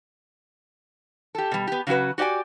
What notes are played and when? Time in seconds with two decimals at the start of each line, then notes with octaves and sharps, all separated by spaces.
1.35 G4 A4
1.52 B2 G3
1.67 B3 G4
1.87 C#3 F#3 C#4 F#4 B4
2.18 F#4 G4 D5 E5 G#5